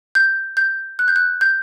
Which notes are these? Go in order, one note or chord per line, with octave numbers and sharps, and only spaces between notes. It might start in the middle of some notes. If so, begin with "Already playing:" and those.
G6
G6
F#6
G6
F#6
G6